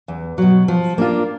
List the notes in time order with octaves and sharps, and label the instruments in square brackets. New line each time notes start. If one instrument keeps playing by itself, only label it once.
[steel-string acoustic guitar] E2
B2 F#3
F3
A#3 D4 F4 A#4